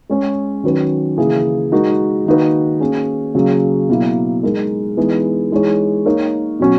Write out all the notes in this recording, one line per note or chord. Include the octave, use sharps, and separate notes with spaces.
G#3 C#4 G#4 C#5
D#3 F#3 C#4 F#4 B4
C#3 E3 A#3 E4 G#4
G#3 D#4 F#4 A#4
D#3 A#3 D#4 F#4 B4
A#3 C#4 G#4
C#3 F#3 A#3 C#4 G#4
B2 F#3 A#3 E4
G#3 D#4 A#4
E3 G#3 B3 D#4 G#4
E3 G#3 D#4 G#4 C#5
A#3 D#4 A#4 C#5
B2 F#3 C#4 F#4